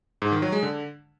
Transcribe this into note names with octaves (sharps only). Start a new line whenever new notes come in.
G#2
D#3
F#3
G#3
D3